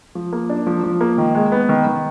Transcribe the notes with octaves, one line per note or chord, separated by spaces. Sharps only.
F3
A#3
D4
F3
F3
A#3
D#3
G#3
B3
D#3
D#3